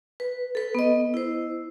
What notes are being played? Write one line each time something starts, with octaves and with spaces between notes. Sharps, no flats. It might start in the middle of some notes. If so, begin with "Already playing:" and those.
B4
A4 B4
B3 D#5
E4 C5